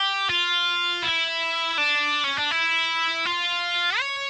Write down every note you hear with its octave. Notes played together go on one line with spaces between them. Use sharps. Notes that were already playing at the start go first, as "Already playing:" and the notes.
Already playing: G4
F4
E4
D4
C#4
D4
E4
F4
C#5